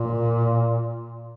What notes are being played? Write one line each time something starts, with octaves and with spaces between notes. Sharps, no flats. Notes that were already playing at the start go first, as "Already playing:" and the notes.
Already playing: A#2